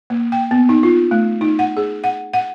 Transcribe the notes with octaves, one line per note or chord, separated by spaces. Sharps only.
A#3
G5
B3
D#4
F4
A3
D#4
F#5
G#4
F#5
F#5